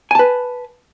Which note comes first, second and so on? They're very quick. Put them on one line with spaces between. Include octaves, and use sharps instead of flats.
G#5 A5 B4